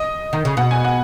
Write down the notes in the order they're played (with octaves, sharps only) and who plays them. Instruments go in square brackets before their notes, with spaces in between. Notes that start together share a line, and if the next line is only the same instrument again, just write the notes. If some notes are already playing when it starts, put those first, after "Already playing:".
Already playing: [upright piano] D#5
[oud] D#3
C#3
[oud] B2 [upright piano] F#5
[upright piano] G#5
F#5